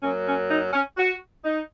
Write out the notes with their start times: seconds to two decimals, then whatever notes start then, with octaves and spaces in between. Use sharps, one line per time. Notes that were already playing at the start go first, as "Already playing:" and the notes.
0.02 F#2 F#3 A#3 C#4
0.26 C#4
0.49 D#4
0.73 C#4
0.97 F#4
1.44 D#4